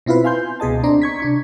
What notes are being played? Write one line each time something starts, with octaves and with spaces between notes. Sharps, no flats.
B2 C4 E4 F4 B4
F5 G#5 C6 G6
C#2 B2 G#4 D#5 A5
C4 D4 D5 A#5 C6
C#6 G#6 B6
C3 D4 C#6